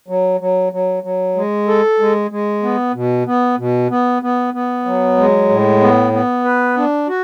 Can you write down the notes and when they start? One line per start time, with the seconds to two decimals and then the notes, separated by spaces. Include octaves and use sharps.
0.08 F#3
0.41 F#3
0.73 F#3
1.03 F#3
1.36 G#3
1.67 A4
2.00 G#3
2.31 G#3
2.63 B3
2.94 B2
3.26 B3
3.58 B2
3.90 B3
4.22 B3
4.54 B3
4.85 F#3
5.17 G#3
5.49 A2
5.81 B3
6.13 B3
6.45 B4
6.77 D4
7.08 F#4